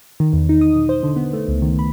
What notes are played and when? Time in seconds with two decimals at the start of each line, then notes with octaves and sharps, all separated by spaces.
0.20 D#3
0.33 E2
0.49 D#4
0.61 D#6
0.75 B1
0.89 C5
1.03 D3
1.16 B3
1.33 A3
1.48 C#2
1.62 D#3
1.79 B5